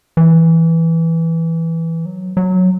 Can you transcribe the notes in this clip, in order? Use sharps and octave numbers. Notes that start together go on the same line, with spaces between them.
E3
F#3
F#3